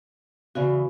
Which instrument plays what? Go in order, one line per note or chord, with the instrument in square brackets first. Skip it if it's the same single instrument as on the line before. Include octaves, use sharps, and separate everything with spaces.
[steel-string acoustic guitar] E2 C#3 E3 [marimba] F#4